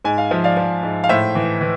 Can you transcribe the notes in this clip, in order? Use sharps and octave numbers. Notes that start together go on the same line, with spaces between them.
G#2 G#5
F5
F3 E5
D5 F5
F3
G#2
F5
A2 C5 E5
E3
E3